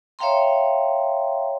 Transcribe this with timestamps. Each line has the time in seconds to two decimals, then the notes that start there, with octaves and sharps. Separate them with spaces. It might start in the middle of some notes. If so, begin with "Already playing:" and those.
0.19 C#5 E5 F5 G5 A#5 C6